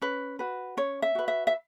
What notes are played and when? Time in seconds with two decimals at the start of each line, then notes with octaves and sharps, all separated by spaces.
0.02 C#4 B4
0.39 F#4 B4
0.77 C#4 C#5
1.02 E5
1.15 F#4 B4
1.28 E5
1.47 E5